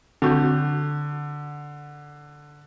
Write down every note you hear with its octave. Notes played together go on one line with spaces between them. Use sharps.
D3 C4 F#4 G6